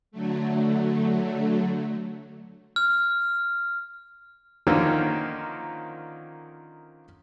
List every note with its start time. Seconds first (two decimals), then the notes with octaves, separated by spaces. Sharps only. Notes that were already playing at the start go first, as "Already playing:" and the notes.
0.11 D3 F#3 A3
2.76 F6
4.67 D3 D#3 F3 A#3 C#4 F4